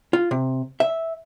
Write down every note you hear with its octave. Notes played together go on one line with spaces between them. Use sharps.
F4
C3
E5